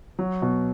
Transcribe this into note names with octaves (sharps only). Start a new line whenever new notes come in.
F#3
B2